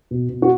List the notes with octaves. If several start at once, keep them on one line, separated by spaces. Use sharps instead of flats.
B2
B2
F#4